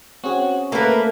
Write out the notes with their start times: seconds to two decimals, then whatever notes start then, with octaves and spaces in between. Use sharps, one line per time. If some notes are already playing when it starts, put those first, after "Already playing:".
0.24 C4 C#4 F#4 G#4
0.72 A3 A#3 A#4 B4